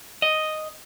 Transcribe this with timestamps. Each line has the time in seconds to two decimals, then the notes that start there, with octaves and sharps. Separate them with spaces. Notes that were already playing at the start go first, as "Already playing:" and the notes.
0.22 D#5